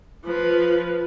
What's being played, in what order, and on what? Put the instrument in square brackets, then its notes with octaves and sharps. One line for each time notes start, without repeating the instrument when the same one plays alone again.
[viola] F3 B4